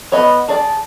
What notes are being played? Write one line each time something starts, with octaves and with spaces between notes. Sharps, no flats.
B3 C#5 D#5 B5
G#4 D5 A5